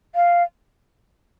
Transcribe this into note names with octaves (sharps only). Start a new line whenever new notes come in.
F5